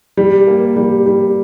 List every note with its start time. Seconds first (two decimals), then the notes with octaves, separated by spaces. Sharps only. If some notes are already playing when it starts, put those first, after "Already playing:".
0.17 G3
0.47 A#3
0.76 G3
1.06 G3